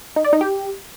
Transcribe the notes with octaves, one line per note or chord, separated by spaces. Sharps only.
D#4
D5
D#4
G4